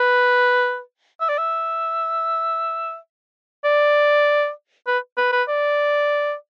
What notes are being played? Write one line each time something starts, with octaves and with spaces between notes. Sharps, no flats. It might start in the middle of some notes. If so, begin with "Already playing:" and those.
Already playing: B4
E5
D5
E5
D5
B4
B4
B4
D5